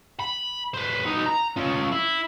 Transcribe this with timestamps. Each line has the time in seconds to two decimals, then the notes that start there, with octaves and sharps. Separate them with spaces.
0.20 B5
0.74 B4 C5
1.05 B3 D#4
1.26 A#5
1.57 C#4 F4
1.92 E4